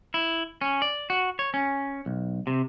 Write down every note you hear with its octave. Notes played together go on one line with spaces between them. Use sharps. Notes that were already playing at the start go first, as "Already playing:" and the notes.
E4
C#4
D5
F#4
C#5
C#4
B1
C3